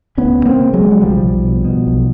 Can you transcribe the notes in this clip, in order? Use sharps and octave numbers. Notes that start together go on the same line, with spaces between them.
D2 B3 C#4
D2
A#3 C4
C#3
F#3 G#3
C#3
F#3
B1 F3 G3
B1
B2
B2
B1